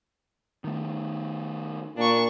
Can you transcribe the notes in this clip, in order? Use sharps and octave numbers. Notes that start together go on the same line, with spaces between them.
D#3 A3
A#2 D4 C#6